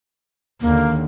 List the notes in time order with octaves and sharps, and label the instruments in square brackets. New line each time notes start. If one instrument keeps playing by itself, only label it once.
[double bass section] D#2 D3 [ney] A#3